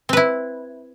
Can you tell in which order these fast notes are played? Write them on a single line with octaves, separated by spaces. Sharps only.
C4 B4 E4